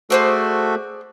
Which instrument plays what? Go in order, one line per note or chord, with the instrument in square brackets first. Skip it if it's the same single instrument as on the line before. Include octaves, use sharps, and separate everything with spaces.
[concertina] A3 F#4 A4 [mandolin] G#4 C5 D5